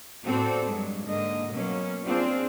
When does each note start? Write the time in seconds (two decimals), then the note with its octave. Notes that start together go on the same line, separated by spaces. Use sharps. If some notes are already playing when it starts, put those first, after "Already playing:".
0.24 A2 C4 F#4 A4 C5 D5
0.68 G2 F#3 G#3
1.06 G#2 D3 A#3 D#5
1.51 B2 F#3 A#3 C#4
2.05 C4 D4 F4 G#4 C5 D5